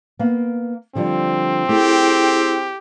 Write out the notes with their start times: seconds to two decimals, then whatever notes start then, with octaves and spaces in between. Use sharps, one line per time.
0.19 A#3 B3 F5
0.95 D3 F3 G3 C4
1.69 A3 E4 G4 G#4